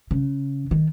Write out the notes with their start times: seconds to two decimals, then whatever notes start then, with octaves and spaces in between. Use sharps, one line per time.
0.11 C#3
0.71 D#3